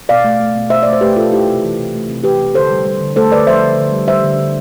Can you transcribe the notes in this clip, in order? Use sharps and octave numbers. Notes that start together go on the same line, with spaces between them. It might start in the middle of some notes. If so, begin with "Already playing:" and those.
B2 D5 F5
A3
A3
B2
B2 C5 E5
A3 D5
C5
A3 G4 B4
B2 F4 A4
A3 E4 G4
C3
E3
C3
A3
C3
E3 G4 B4
C3
D3 A4 C5
G3
G3
D3
A3 A4 C5
D3 B4 D5
F3 C5 E5
D3
D3
G3
G3 C5 E5
D3
D3